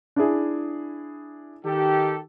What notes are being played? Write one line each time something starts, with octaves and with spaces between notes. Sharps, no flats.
D4 E4 G#4
D#3 G4 A4